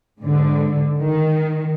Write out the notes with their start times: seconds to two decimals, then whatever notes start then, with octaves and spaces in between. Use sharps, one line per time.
0.20 G#2 D3
0.97 D#3